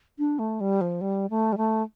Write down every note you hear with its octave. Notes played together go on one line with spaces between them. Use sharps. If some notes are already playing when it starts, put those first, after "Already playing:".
D4
A3
G3
F3
G3
A3
G3
A3